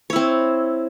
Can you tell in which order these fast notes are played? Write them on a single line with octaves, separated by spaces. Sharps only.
C#5 E4 C4